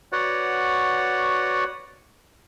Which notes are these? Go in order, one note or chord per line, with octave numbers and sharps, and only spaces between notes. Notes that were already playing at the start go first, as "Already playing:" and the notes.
F#4 B4 C#5 D5 F#5